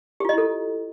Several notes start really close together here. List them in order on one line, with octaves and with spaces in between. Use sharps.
G4 F4 D#5 E4 A4